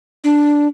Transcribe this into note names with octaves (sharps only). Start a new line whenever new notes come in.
D4